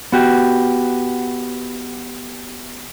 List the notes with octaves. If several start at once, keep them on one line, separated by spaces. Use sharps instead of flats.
B3 F#4 G4